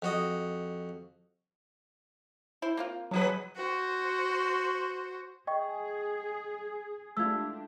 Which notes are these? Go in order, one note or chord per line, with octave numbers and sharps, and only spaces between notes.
F2 F#4 D#5
E4 C5
A#3 C4 F4
G#2 F3 F#3 B4
F#4 C5
G#4 D#5 G5 C#6
A3 D4 F4 G4 E6 G#6